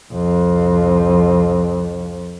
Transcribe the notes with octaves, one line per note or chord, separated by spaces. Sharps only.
C2 F2